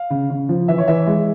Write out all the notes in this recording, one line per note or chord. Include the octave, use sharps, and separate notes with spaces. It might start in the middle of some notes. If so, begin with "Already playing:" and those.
Already playing: F5
C#3
C#3
F3
E3 E5
C#5
E3 E5
G#3